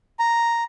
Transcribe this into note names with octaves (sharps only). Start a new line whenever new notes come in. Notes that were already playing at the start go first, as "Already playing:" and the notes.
A#5